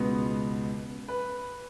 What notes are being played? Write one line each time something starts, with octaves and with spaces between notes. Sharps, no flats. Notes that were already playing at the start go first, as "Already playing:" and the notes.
Already playing: C#2 B2 B3
B4